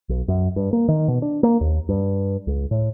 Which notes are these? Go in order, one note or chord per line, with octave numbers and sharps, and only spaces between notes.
B1
F#2
G2
A#3
D#3
B2
D4
A#3
D#2
G2
C#2
A2